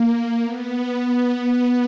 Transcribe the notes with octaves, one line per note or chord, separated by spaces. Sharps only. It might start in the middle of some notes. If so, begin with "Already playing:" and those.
Already playing: A#3
B3